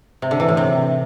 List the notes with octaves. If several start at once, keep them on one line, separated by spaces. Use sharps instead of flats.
C3
D3
E3
A2
C3